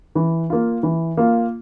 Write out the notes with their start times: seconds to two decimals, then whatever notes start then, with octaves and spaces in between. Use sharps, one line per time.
0.15 E3
0.50 A#3 F4
0.83 E3
1.17 A#3 F4